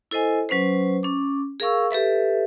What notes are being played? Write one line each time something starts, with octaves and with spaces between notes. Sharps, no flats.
E4 A4 C5 D#5 G#5
F#3 C#4 B4 C5
C#4 D6
G#4 A#4 F5 C#6 E6
G4 A4 B4 E5